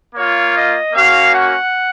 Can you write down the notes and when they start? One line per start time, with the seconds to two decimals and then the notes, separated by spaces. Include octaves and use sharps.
0.15 A#3 F4 C#5
0.55 D#5
0.93 A#3 C#4 F#4 F5
1.32 F#5